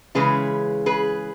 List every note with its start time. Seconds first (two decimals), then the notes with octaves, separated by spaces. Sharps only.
0.15 C#3 E3 G#3 C#4 G#4 B4
0.86 G#4 B4